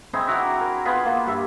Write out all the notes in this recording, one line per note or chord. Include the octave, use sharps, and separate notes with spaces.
C4 D#4 E4 G#4
E4 F#4 A#5 D6
A#4
B3 F4 G#4 B5
A#3
G2 E5